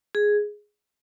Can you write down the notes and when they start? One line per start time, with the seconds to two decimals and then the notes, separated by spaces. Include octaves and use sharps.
0.15 G#4